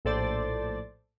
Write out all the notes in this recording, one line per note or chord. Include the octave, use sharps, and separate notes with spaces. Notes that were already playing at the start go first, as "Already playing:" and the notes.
A#1 A2 A4 C5 D5 A6